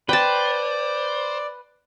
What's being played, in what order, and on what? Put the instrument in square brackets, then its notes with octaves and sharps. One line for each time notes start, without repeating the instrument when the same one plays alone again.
[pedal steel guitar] B4 [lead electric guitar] C5 [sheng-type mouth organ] D5 [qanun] G5 A5